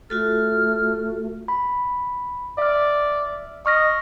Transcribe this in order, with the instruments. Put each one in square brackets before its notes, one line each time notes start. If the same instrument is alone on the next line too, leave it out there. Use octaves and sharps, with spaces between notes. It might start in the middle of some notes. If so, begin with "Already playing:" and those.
[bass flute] A3 [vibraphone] F4 F#4 A4 [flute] F6
[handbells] B5
[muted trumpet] D5 [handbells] E5 F6
[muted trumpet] D#5 [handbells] C#6 F6 A#6